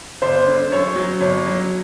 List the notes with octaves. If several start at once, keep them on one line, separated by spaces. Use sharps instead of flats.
G1 C5
D3
F#2 C#5
F#3
G1 C#5
F#3